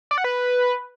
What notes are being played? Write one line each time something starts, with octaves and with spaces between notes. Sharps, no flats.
D5
F#5
B4